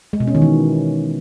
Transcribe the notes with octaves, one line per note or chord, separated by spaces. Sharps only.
G#3
B2
C#4
D#3
E3